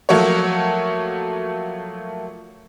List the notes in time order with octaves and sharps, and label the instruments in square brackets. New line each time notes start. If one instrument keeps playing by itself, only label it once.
[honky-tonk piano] F3 F#3 A3 A#3 F#4 C#5